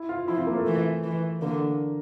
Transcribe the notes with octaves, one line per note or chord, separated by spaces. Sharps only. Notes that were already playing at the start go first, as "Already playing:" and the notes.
Already playing: E4
F4
F3 E4
C4
A#3
A3
E3
E3
D3 A#3